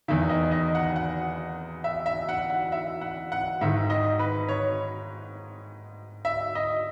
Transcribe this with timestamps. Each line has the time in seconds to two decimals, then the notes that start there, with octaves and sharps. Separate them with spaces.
0.08 E2 D#3 E5
0.29 D#5
0.51 D#5
0.75 F#5
0.96 F#5
1.84 E5
2.06 E5
2.29 F#5
2.50 F#5
2.72 E5
3.01 F#5
3.32 F#5
3.61 G#2 D#3 E5
3.90 D#5
4.19 B4
4.49 C#5
6.25 E5
6.55 D#5